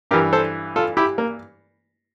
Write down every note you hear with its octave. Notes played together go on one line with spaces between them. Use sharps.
G2 E3 G4 A#4
A4 C5
F4 A4
E4 G4
A#3